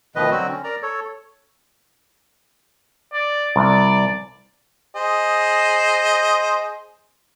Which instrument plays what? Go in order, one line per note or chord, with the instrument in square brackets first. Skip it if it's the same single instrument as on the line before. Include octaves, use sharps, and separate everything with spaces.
[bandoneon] D2 B2 D#3 F3 B4 D#5
D3 F#3 C4 F#4
C#4
A#4 D5 A#5
A4 C#5
[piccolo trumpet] D5
[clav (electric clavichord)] C2 [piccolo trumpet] D5
[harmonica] G#4 C5 D#5